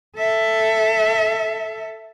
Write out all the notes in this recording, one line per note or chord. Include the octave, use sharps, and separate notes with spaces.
A4 E5